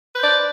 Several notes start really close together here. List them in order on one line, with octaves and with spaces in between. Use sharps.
B4 C5 D5